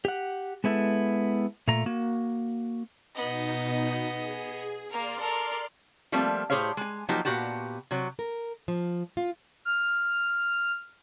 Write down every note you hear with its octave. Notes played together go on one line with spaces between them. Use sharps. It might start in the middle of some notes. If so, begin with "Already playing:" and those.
G4 F#5
G#3 B3 E4 A4
A#2 A3 A#5
A#3 F#4
B2 B3 D#4 D#5
G#4
A#3 A#4 D5 C6 F6
A4 A#4
F3 G3 A3 A#3 C4 F4
A2 G4 G#4 C5 C#5 F5
G#3 G#5
F3 F#3 A#3 D#4 G4
A#2 E3 B3 F#4 G4 A5
C3 F#3
A#4
F3
F4
F6